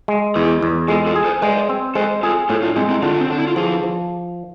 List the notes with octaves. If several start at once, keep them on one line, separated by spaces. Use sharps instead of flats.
G#3
E2 E4 G#4
E2
G#3 F4 A4
F4 A4
G#4
A4 C5
G#3 B4 D5
C4
G#3 A4 C5
F4 G#4 A4
A2 F4 A4
D4 F4
G#3 C4 E4
C4 E4
D3 D4 F4
C4
D3 D4
E4
F4
F3 E4 G#4
F3